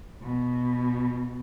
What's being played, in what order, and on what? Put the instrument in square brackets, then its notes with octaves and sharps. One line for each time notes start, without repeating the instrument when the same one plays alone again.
[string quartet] B2